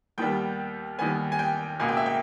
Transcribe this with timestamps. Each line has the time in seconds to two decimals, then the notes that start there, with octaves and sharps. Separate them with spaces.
0.18 D#2 D#3 G3 B3 G5
0.99 D#2 D#3 G3 B3 G#5
1.32 G#5
1.39 G5
1.79 C#2 B2 A#3 G#5
1.88 G5
1.97 E5
2.06 G5